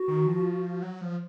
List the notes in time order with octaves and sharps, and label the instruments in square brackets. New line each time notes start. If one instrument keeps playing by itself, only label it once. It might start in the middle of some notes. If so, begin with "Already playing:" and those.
Already playing: [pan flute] F#4
[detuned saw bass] D#3
F3
F#3
F3